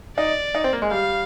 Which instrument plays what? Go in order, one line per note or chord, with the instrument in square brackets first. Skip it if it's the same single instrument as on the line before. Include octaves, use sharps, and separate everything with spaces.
[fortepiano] D#4 [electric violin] D5
[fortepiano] D#4
C4
A#3
G#3
[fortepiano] G3 [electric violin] F5